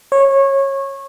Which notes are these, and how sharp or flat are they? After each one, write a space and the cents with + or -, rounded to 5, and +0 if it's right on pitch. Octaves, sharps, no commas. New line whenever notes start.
C#5 -20